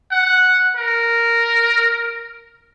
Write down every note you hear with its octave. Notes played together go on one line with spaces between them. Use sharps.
F#5
A#4